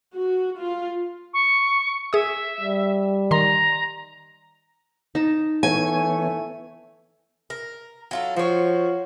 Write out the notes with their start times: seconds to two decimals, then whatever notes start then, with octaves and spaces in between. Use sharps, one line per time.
0.13 F#4
0.59 F4
1.34 C#6
2.13 G#4 E5 D#6
2.61 G3
3.31 D#3 A#5 C6
5.15 D#4 A5
5.63 E3 A3 B3 C#5 G#5
7.50 A#4
8.11 F#3 F4 A4
8.36 F3 F#4 C#5